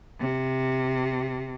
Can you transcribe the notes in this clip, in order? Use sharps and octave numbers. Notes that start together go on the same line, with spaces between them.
C3